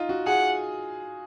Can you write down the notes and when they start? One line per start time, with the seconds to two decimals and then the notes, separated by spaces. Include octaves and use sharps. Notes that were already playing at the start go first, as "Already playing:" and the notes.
Already playing: D#4 F4
0.09 F#4
0.27 G#4 F#5